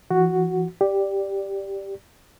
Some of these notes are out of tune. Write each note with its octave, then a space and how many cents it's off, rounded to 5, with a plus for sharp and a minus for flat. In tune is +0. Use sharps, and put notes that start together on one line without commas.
E3 +40 F#4 +0
G4 +0 D5 +0